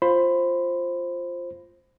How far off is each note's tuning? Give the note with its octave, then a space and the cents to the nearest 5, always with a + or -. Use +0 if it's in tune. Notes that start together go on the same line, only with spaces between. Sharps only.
F4 +0 C5 +10 B5 +20